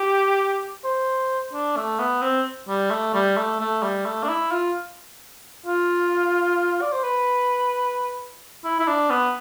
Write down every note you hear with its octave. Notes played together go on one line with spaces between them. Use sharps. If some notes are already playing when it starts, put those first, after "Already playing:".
Already playing: G4
C5
D4
A3
B3
C4
G3
A3
G3
A3
A3
G3
A3
D4
E4
F4
F4
D5
C5
B4
E4
E4
D4
B3